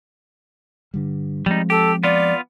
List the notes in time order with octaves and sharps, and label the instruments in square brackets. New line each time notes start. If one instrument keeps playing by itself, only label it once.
[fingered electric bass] G2 D3 G3
[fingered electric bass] F3 G#3 C4 [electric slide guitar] G3 D#4
[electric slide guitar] G4 [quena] A4
[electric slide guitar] B3 F4 [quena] D5